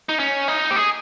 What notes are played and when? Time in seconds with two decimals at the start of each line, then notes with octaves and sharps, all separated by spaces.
0.09 D#4
0.19 C#4
0.48 D#4
0.71 G4
0.76 G#4